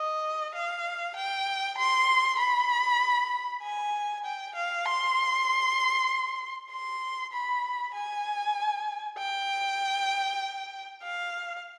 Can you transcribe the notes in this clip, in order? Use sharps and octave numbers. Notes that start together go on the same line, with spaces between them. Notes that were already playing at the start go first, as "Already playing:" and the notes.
Already playing: D#5
F5
G5
C6
B5
G#5
G5
F5
C6
C6
B5
G#5
G5
F5